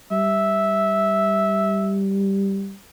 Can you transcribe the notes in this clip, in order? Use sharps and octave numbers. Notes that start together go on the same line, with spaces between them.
G3 E5